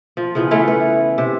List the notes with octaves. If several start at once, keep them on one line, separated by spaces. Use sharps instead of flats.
F3
C#3 E3 F3 B3
E3 A3 C#4 E4
B4
C3 E5